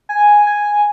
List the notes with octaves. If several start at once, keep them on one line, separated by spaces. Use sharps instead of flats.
G#5
G#5